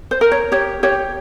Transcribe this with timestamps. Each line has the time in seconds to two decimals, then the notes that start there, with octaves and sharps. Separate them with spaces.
0.11 C5
0.21 A#4
0.32 C#5
0.52 G4 C#5
0.83 G4 C#5